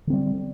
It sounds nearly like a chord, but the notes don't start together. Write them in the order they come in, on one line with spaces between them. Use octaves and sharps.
D3 C4 G3